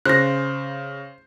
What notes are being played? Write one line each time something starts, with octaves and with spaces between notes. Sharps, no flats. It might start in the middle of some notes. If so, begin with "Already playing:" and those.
C#3 C5 F#6 A#6